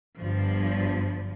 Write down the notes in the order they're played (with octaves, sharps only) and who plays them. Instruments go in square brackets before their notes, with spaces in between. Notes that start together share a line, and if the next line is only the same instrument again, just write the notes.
[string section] G1 G2 F3